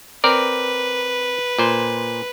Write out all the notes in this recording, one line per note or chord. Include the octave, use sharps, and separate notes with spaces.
C4 A#4 B4 D5
A#2 C5